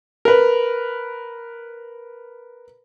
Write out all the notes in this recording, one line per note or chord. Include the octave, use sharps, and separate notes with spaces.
A#4 B4